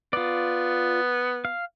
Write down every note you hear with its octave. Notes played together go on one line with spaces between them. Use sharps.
B3 F4 D5
F5